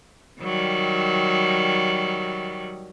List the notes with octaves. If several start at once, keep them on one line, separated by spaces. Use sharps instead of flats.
D#3 F#3 G3